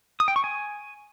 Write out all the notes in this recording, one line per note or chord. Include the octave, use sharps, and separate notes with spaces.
D#6
G5
C#6
G#5